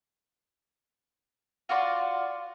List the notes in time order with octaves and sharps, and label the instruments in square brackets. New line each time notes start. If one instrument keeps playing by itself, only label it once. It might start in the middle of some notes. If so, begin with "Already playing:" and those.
[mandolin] F4 F#4 D5 C6